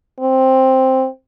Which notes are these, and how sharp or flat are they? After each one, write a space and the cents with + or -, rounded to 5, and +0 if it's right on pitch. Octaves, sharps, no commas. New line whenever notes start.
C4 +5